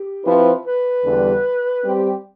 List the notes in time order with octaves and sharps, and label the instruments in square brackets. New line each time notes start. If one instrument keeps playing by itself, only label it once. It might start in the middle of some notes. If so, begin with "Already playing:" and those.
Already playing: [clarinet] G4
[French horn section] F3 C4 E4 B4
[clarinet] B4
[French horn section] E2 D3 G3
G3 C4 G4